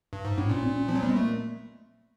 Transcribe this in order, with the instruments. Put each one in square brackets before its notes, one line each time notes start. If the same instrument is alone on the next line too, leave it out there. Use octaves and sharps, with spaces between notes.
[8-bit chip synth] G2
G#2
[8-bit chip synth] A2 [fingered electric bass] D4
[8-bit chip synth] A#2 [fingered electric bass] C#4
[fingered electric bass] C4
C#4
[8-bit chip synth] F3 [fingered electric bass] C4
[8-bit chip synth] F#3
[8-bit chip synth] G3 [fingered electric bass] B3
[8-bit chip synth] G#3
[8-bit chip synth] A3 [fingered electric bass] A#3